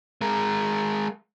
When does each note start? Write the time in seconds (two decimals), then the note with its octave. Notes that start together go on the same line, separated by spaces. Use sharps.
0.21 G#3 A#4